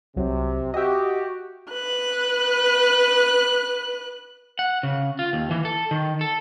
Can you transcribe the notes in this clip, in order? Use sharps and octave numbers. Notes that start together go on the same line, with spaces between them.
C2 C3 F#3
F#4 G4 D#5 E5
B4 F#6
F#5
C#3
F4
D#2
E3
A4
D#3
A4